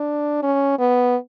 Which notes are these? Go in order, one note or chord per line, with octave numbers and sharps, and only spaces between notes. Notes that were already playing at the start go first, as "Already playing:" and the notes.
Already playing: D4
C#4
B3